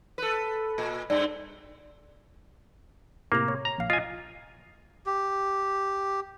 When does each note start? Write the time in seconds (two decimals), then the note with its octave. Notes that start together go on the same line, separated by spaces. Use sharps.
0.18 A4 B4
0.78 A#2
1.10 G2 C4 D5
3.32 A2 C3 A#3 A#5
3.48 C#5
3.65 A#5
3.78 A#1 F5
3.90 F4 D#5 G#5
5.06 G4